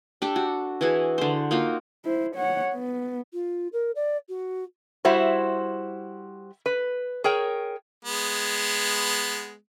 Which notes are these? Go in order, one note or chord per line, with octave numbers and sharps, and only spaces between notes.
D4 G4 A4
F#4
E3 E4 F#4 G#4
D3 C5
A#3 D#4 F4 F#4
E4 C5
C#5 F#5
B3
F4
A#4
D5
F#4
G3 E4 F#4 C5
B4
G#4 A#4 C#5 G5
G#3 B3